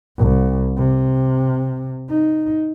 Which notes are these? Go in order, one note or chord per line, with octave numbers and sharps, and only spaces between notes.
C2
C3
D#4